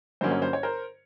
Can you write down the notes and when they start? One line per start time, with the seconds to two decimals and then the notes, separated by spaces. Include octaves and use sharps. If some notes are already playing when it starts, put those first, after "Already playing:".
0.21 G2 D3 F#3 A#3 C#4 C5
0.31 C#5
0.42 C5
0.53 C#5
0.63 A#4 C5